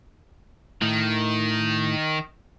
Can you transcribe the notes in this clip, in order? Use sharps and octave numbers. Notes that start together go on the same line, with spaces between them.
A2 D#3